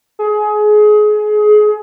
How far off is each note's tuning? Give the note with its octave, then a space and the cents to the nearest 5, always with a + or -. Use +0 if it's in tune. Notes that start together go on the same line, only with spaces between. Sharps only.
G#4 +25